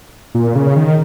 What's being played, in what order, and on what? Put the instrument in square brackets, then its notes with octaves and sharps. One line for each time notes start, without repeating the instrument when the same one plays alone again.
[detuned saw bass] A#2
C#3
D#3